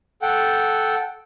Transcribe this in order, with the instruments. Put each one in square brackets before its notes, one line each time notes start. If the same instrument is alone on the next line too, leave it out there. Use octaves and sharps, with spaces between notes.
[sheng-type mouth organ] A4 F#5 G5